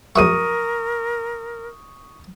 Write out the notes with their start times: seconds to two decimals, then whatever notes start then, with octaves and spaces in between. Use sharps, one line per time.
0.16 A#1 F#2 A#4 E5 C#6 D#6 D#7